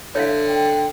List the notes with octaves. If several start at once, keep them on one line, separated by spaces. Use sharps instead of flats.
D3 C#5 E5 F5
G5